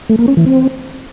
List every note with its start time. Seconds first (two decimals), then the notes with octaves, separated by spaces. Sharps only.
0.09 A3
0.19 A#3
0.28 C#4
0.37 E3
0.46 C4